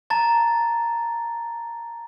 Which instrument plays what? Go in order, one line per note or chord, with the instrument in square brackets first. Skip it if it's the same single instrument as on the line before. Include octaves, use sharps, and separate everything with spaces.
[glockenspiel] A5 A#5 A6